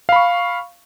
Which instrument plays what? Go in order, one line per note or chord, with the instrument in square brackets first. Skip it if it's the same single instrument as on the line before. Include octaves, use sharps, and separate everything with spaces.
[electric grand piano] F5
B5
C#6